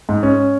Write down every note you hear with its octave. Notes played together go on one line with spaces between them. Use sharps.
G#2
C#4